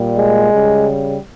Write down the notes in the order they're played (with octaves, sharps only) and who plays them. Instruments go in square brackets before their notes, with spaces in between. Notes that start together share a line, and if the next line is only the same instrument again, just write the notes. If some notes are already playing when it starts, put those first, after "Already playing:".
Already playing: [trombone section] A#2 G3
G#3
C#3 G3